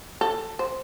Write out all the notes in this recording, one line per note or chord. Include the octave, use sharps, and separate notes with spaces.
A4
C5